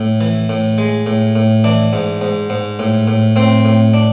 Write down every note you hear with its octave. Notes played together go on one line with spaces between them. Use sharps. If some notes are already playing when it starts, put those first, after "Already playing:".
Already playing: A2
E3
A2
G#3
A2
A2
E3 D4
G#2
G#2
G#2
A2
A2
A2 C4
A2
D4